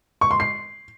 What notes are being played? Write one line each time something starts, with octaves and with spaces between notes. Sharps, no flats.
C#6
C6
C7